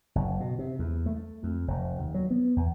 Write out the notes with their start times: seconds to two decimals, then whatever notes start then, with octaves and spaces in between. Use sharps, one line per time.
0.15 F#1
0.40 B2
0.59 C3
0.79 E2
1.06 A3
1.43 F2
1.68 F1
1.98 D#2
2.14 F#3
2.30 B3
2.56 E2